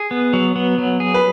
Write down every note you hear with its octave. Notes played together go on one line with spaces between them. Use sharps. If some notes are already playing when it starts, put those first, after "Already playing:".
Already playing: G#4
B3
F#3
B3
F#3
G#4
B4